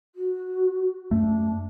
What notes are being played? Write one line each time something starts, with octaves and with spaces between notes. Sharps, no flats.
F#4
F#2 A3 D4